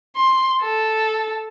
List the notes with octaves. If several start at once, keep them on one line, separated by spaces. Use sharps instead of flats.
C6
A4